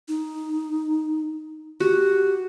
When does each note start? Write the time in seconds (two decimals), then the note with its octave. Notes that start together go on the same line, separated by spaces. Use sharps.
0.08 D#4
1.80 F#4 G4